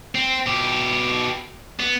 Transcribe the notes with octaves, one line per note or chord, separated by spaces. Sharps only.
C4
B2 G4
B3